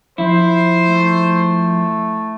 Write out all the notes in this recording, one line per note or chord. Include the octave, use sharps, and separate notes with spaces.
F3 E4 C5
A3